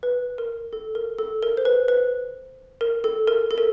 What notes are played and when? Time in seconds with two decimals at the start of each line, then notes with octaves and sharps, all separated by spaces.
0.03 B4
0.38 A#4
0.73 A4
0.95 A#4
1.19 A4
1.43 A#4
1.57 C5
1.65 B4
1.88 B4
2.81 A#4
3.04 A4
3.28 A#4
3.51 A4
3.58 A#4